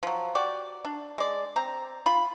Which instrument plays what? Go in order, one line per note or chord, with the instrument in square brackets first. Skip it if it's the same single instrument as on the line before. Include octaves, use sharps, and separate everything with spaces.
[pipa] F3 F#3
F#4 G4 D5
D4
G#3 D5
C4 A#5
F4 B5